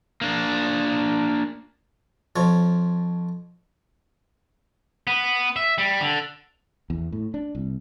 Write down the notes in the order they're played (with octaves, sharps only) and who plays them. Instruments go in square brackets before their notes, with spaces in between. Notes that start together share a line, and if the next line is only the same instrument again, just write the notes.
[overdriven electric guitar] A#3 D4
[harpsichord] F2 F3 C#5
[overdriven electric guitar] B3
E5
G3
D3
[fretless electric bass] E2
A2
D4
C2